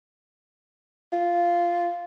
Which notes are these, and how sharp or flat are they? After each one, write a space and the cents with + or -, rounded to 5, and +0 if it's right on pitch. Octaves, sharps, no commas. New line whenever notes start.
F4 -5